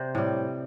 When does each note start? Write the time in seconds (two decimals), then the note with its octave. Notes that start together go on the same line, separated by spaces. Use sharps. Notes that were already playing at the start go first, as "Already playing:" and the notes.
Already playing: C3 C5 D5
0.15 A2 G3